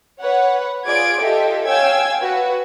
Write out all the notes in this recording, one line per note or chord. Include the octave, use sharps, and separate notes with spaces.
B4 C#5 F#5
F4 G#4 D5 G#6 D7
F4 G4 A4 D#5 E5
C#5 F5 G5 G#5 E6 G#6
F#4 B4